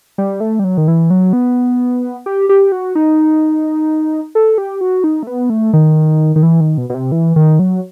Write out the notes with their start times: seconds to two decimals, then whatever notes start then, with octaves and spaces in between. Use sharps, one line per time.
0.18 G3
0.40 A3
0.59 G3
0.64 F#3
0.77 D#3
0.88 E3
1.10 F#3
1.33 B3
2.26 G4
2.49 G4
2.72 F#4
2.95 D#4
4.35 A4
4.58 G4
4.81 F#4
5.04 D#4
5.23 A3
5.27 B3
5.50 A3
5.73 D#3
6.36 D#3
6.43 E3
6.61 D#3
6.78 B2
6.90 B2
6.94 C3
7.12 E3
7.36 D#3
7.59 F#3